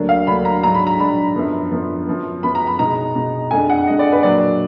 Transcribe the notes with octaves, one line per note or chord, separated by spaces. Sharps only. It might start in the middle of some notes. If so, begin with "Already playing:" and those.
Already playing: D2 D3 F#3 A#3 D4
F5
D2 D3 F#3 A#3 D4 B5
A#5
G#2 F#3 D4 A#5
B5
A#5
G#2 F#3 D4 B5
F#2 D3 F3 B3
F#2 D3 F3 B3
F#2 F3 B3
F#2 F3 B3 B5
A#5
B5
B2 G#3 D#4 A#5
B2 G#3 D#4
F2 D3 G#3 D4 G#5
F#5
F2 D3 G#3 D4 D#5
D5
B4
A#2 F#3 A#3 D4 D5